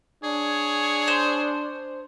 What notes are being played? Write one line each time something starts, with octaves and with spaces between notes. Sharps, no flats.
D4 G#4 C#5
C5